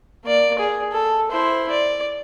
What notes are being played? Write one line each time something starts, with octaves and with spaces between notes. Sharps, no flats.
A#3 D5
G#4
A4
E4 C5
D5